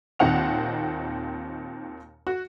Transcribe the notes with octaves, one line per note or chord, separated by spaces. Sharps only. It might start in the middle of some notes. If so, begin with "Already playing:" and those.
D#2 A#2 D#3 C4 F#5 F7
F#4